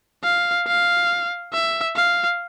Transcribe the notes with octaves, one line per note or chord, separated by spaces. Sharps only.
F5
F5
E5
F5